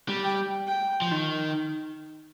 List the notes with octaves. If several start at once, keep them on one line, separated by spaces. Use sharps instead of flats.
G3
G5
G5
F3
D#3